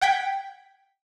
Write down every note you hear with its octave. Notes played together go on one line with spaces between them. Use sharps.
F#5 G5 G#6 B6